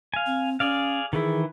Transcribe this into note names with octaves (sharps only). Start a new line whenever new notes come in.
F5 G#5
C4
C#4 G#4 D5 F5
D#3 E3 E4 G#4